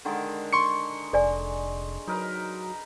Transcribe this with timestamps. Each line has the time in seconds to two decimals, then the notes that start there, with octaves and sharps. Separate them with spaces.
0.05 D3 D#3 G#3
0.53 C6 C#6 C#7
1.13 F1 A4 D5 G#5
2.08 F#3 D#4 A#4 B4